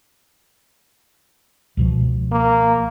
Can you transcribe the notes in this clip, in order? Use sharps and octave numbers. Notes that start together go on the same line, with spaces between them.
C#2 B2 F3
A#3